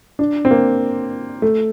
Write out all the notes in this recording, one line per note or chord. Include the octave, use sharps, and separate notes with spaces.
D4
C4
A#3
A3